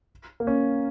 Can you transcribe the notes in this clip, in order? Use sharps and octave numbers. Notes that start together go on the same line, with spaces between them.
A#3
C#4